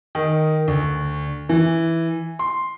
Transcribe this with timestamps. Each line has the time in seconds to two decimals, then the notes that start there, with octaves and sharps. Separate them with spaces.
0.15 D#3
0.68 D2
1.49 E3
2.39 C6